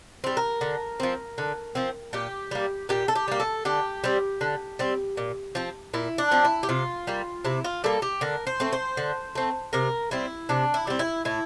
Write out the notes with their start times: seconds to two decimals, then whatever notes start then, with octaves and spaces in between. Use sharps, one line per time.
0.24 G3 C4
0.37 A#4
0.61 D3
1.00 F3 C4
1.38 D3
1.75 F3 C4
2.13 A#2 G4
2.51 G3 A#3
2.89 A#2 G4
3.08 A4
3.15 G4
3.28 G3 A#3
3.40 A4
3.65 D3 G4
4.04 G3 C4
4.41 D3
4.79 G3 C4
5.17 A#2
5.55 F3 C4
5.94 A#2 E4
6.18 D4
6.31 F3 C4
6.45 E4
6.63 G4
6.69 C3 F4
7.07 G3 A#3
7.45 C3 E4
7.64 F4
7.84 G3 A#3 A4
8.02 G4
8.21 D3 A#4
8.47 C5
8.60 A3 C4
8.73 C5
8.97 D3
9.35 A3 C4
9.73 C3 A#4
10.11 G3 C4 E4
10.49 C3 D4
10.74 E4
10.87 G3 C4
10.99 E4
11.25 A2 E4